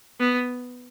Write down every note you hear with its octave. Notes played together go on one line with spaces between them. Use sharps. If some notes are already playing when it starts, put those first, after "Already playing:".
B3